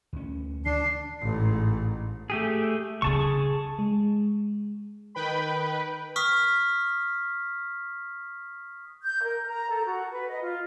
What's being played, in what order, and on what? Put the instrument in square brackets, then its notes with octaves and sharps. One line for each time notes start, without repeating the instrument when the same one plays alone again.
[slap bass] D2 C#4
[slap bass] D3 [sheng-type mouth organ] D4 [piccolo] C7
[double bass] A1 G#2
[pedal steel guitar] A3 G4 G#4
[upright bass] C#3 D4 [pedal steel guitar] G#4 A5 C#6
[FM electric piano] G#3
[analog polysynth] D#3 B4 G5 B5
[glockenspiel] C#6 D#6 F6 B6
[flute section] G6
A#4
A#5
A4
F#4
B4
D#5
F4